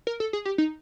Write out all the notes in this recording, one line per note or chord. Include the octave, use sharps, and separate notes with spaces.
A#4
A4
G#4
G4
D#4